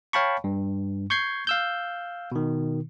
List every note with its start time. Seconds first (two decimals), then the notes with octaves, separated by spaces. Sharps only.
0.13 C#5 F5 G5 A5 B5 C#6
0.44 G2
1.10 C#6 G6 G#6 C7
1.47 F5 E6 G6
2.32 B2 D#3